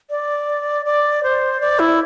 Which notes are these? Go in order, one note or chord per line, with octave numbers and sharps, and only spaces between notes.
D5
D5
C5
D5
E4